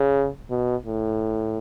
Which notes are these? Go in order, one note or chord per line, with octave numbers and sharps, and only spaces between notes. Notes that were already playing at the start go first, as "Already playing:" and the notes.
Already playing: C#3
B2
A2